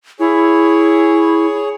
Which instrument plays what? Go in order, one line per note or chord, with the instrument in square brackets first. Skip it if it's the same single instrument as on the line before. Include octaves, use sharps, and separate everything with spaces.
[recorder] E4 [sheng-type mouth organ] G#4 C#5